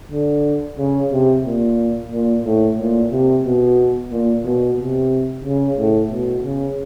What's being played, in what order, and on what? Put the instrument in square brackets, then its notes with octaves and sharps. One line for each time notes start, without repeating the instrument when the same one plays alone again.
[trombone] D3
C#3
C3
A#2
A#2
A2
A#2
C3
B2
A#2
B2
C3
C#3
A2
B2
C#3